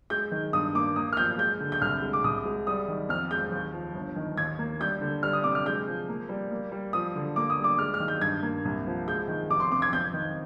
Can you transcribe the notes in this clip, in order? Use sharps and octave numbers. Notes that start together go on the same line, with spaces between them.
G#3 G6
D#3
G2 D#6
A#3 D6
A#3 D#6
F6
F3 G6
G#3 G6
D3
G6
C2 F6
G#3
D6
C2 D#6
G#3
G3 D#6
D#3
F2 F6
G#3 G6
D#2
F3
G1
D#3
D#2 G#6
A#3
G3 G6
D3
G3 F6
D#6
C3 D6
F6
G#3 G6
F3
A#3
G3
A#3
G3
F3 D#6
D3
A#3 D6
D#6
G3
D6
G#3 F6
F6
D#3
G6
G2 G#6
A#3
C2
F3
G#3 G6
D#3
F1 D6
C6
C3 D6
G#6
F2 G6
D#3